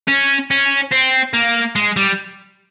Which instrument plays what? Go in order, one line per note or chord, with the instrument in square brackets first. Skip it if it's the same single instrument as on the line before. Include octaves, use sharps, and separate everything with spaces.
[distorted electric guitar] C#4
C#4
C4
A#3
G#3
G3